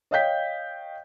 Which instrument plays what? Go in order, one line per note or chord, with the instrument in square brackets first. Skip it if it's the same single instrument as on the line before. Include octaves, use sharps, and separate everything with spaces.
[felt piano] C#5 D#5 F5 G5 G6 B6